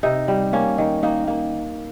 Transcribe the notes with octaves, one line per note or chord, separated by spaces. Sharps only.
C3 D#4
G3
A#3 C#4
D#3
A#3 D#4
A#3